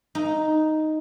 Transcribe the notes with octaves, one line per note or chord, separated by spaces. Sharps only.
D#4